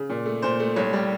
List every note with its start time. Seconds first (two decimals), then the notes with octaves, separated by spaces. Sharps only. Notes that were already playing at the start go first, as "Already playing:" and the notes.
Already playing: C#3
0.10 A#2
0.26 A3
0.42 A#2 C5
0.60 A3
0.76 C2 C#5
0.93 G3